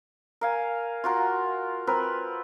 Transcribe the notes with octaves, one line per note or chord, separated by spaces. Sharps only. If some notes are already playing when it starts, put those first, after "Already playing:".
A#4 F5 G#5
F4 F#4 A#4
C4 A#4 B4